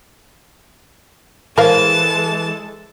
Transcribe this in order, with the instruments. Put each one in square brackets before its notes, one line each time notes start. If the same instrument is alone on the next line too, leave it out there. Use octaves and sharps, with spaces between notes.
[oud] E3 [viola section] G#3 A4 [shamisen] A#4 F5 [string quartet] A5